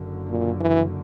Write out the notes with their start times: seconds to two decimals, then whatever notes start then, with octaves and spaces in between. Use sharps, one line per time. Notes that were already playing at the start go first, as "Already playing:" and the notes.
Already playing: F#1 F#2 D3
0.30 A#2
0.61 E3